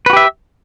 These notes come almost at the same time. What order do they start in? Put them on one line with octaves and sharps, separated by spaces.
B4 F#4 G4 E5